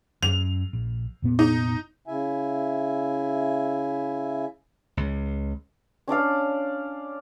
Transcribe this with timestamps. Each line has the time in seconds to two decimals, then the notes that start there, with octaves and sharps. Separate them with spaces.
0.23 F#2 F7
0.73 A#1
1.22 F1 A#2 B3
1.39 D#4
2.07 C#3 E4 E5 G#5
4.97 C#2
6.08 C#4 D4 D5 F5